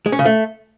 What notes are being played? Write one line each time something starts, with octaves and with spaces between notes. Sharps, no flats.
G#3
C#4
C#3
A3